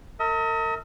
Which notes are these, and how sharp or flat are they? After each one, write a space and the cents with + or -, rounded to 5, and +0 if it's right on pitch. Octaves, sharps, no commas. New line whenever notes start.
A#4 -40 D#5 +40